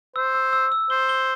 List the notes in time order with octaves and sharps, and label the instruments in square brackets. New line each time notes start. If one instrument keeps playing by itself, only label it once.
[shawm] C5 [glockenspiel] E6
[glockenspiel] E6
E6
E6
[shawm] C5 [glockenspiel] G7
[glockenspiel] G7